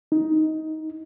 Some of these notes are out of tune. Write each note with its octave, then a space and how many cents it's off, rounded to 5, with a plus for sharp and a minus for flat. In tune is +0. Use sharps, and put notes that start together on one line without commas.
D#4 +15